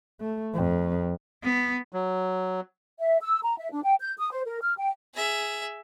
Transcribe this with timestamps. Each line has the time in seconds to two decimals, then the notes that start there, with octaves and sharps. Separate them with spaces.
0.21 A3
0.54 F2
1.44 B3
1.93 F#3
2.98 E5
3.21 E6
3.42 A#5
3.58 E5
3.72 D4
3.83 G5
4.00 G6
4.18 D#6
4.32 C5
4.46 A#4
4.62 F6
4.77 G5
5.14 G#4 E5